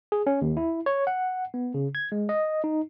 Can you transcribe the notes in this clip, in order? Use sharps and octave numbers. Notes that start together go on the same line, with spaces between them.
G#4
C#4
D#2
E4
C#5
F#5
B3
C#3
G#6
G#3
D#5
D#4